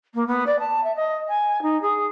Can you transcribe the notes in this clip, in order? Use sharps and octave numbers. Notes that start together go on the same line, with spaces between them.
A#3
B3
D5
A5
E5
D#5
G#5
D#4
G#4